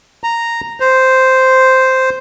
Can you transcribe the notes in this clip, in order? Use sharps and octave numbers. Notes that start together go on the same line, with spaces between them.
A#5
C5